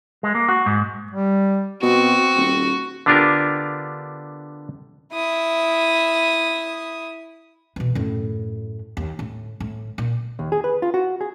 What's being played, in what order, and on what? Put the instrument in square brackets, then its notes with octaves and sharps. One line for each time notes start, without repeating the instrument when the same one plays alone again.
[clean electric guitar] G#3
A#3
F#4
G#2
[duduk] G3
[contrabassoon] B2 [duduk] C4 [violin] F#4
[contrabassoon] D#1
[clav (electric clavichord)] D3 B3 D4 F4 G4 A#4
[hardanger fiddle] E4 D#6
[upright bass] B2 E3
F#2 A2
D#2
A2
A2
A#2
[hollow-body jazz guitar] D#2
G#4
B4
F4
F#4
G#4